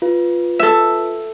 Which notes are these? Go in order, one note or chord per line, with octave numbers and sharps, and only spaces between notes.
F4 B4
A4 E5